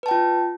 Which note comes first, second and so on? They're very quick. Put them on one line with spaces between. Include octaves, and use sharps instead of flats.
B4 A5 G5 F4